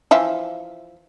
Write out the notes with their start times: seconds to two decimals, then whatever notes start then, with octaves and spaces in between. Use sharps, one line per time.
0.11 E3 F3 E5